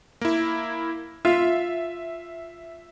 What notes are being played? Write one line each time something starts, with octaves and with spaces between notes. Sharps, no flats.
A#3 E4
F4 E5